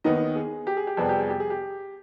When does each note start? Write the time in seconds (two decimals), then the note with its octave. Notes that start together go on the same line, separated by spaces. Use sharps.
0.04 D#2 D#3 B3 D#5
0.35 G#4
0.67 G4
0.77 G#4
0.87 G4
0.97 F2 C3 G3 B3 G#4
1.09 G4
1.18 G#4
1.30 G4
1.40 G#4
1.50 G4